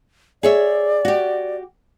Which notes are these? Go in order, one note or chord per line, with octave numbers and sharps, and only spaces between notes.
G#4 C#5 D5 E5
F#4 G4